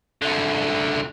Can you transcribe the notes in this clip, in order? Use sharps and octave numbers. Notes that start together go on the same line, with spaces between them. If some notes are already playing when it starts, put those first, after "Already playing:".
C2 D3